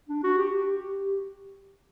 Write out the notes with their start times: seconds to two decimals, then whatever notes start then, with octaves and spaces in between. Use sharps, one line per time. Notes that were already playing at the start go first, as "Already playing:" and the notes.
0.09 D4
0.24 F#4
0.38 G4
0.65 G4